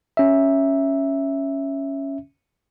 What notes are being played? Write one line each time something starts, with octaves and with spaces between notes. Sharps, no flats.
C#4 E5